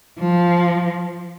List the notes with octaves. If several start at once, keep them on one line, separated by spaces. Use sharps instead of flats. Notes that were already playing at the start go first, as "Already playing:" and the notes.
F3